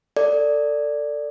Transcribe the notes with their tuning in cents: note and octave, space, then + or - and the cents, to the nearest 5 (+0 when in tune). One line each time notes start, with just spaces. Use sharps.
A4 +25 D5 +0